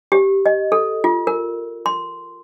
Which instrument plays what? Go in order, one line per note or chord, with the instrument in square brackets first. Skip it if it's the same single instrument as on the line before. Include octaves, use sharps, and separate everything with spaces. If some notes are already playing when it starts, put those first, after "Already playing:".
[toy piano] G4
D#5
A4
F4
A#4
C6